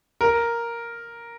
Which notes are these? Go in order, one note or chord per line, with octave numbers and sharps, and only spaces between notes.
A#4